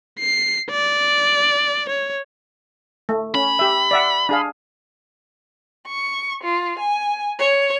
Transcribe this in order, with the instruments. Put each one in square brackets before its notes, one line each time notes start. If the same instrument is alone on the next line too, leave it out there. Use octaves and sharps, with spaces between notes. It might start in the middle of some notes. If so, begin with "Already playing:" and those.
[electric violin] C7
D5
C#5
[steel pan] A3
[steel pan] C#4 [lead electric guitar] B5
[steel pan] G4 E5
D5 E5 F#5
D4 G#4 F5
[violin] C#6
F4
G#5
C#5